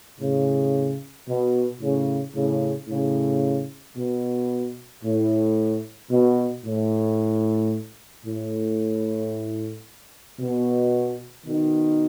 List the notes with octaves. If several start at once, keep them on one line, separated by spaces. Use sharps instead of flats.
A2 C#3
B2
A2 C#3
A2 C#3
A2 C#3
B2
A2
B2
A2
A2
B2
B2 D#3